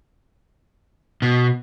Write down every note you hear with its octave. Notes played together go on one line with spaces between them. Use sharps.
B2